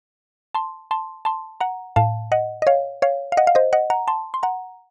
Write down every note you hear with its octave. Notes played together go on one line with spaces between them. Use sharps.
A5 C6
A5 C6
A5 C6
F#5 A#5
A2 F5 A5
D#5 F#5
D#5
C#5 F5
C#5 F5
F5
D#5 F#5
F5
C5 D#5
D#5 F#5
F#5 A#5
A5 C6
C6
F#5 A#5